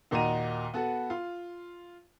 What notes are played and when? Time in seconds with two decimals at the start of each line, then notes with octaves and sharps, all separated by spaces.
0.11 D#2 A#2 D#4 F#4 A#5 D#7
0.74 B3 F#4 A4
1.10 F4